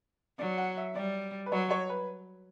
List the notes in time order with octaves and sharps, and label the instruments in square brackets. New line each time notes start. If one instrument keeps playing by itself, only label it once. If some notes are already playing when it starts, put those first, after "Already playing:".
[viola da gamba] F#3 [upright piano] D5
[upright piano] F#5
E5
[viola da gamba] G3 [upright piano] D5
[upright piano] B4
[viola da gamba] F#3 [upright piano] C#5
[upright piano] C#5
B4